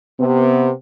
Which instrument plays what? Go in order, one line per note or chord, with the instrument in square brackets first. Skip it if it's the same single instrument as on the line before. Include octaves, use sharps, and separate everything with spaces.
[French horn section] C3 B3